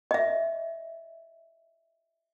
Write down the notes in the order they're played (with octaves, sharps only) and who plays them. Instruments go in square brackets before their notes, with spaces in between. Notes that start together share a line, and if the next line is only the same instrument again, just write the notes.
[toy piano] D#5 E5